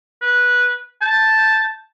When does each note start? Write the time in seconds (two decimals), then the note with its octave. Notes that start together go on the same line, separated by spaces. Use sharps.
0.22 B4
1.02 A5 G6